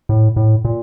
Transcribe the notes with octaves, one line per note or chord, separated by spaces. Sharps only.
A2
A2
A#2